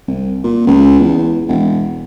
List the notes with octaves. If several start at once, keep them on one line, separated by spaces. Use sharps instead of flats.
C2
A#2
C#2
E2
E1